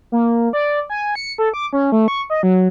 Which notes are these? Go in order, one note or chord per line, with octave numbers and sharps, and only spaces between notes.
A#3
D5
G#5
C#7
A4
D6
C#4
A3
C#6
D#5
F#3